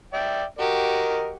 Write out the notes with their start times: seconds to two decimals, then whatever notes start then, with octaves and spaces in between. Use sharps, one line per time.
0.14 D5 E5 G5
0.59 F#4 G4 A#4 D#5